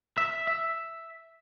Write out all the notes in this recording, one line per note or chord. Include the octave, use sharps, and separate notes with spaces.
E5
E5